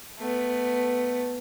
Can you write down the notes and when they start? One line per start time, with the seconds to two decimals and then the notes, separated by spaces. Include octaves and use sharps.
0.19 A3 B3